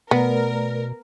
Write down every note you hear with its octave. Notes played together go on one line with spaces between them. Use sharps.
B2 A3 B3 A#4 B4 D5